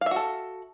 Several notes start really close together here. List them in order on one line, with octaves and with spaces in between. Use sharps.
F5 E5 F#4 A4